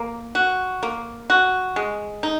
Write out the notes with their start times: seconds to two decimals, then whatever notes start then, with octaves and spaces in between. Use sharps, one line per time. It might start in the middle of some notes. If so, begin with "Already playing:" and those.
Already playing: A#3
0.35 F#4
0.83 A#3
1.30 F#4
1.76 G#3
2.23 D#4